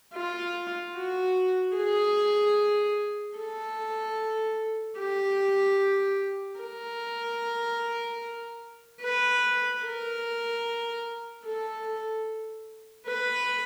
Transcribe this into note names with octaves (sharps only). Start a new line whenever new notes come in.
F4
F#4
G#4
A4
G4
A#4
B4
A#4
A4
B4